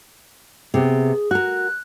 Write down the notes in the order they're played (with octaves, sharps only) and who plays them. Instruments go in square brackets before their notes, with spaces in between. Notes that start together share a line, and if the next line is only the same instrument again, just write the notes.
[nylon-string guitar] C3 B3 [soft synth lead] G#4
[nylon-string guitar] F#4 A#4 [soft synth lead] F#6